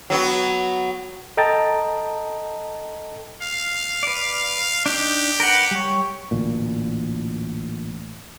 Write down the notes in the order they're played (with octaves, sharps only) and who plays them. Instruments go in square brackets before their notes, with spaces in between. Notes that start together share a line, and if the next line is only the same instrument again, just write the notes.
[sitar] F#3 B3 F#4
[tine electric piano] A4 D#5 G5 A5 A#5 A6
[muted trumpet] F5
[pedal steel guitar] B4 D5
[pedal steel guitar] D4 D#4 [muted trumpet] G4
[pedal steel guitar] A#4 B4 F#5
G3 C#5
[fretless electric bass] A1 D2 A#2